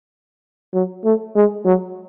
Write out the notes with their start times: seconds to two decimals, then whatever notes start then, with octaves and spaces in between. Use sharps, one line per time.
0.74 F#3
1.04 A3
1.35 G#3
1.65 F#3